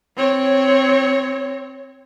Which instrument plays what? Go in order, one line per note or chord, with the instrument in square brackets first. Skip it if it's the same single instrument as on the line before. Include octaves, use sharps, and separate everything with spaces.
[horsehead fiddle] C4 C#5